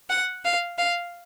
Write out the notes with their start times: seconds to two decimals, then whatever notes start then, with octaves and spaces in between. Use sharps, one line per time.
0.10 F#5
0.44 F5
0.78 F5